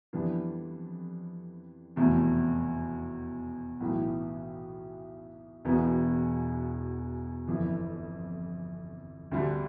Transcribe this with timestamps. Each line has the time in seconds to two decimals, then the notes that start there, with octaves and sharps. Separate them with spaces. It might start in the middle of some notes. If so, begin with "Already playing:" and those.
0.13 F2 E3 G3 B3 D4
1.96 F1 E2 B2 A3
3.80 B1 A2 E3 A3
5.65 E1 E2 B2 B3
7.47 G1 F2 E3
9.31 D2 D3 G3 D4